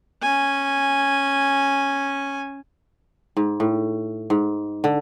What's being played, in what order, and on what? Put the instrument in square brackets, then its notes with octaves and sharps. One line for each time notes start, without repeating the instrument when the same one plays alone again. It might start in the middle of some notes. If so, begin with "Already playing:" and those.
[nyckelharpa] C#4 G#5
[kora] G#2
A2
G#2
D3